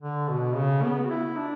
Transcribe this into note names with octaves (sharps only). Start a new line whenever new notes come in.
D3
B2
C#3
B3
F#4
E4
D4